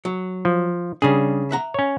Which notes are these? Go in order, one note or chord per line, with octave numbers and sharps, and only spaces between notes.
F#3
F3
C#3 G3 D4 G#4
E5 F#5 A#5
C#4 C#5